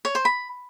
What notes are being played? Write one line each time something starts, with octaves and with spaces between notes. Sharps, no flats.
C#5
C5
B5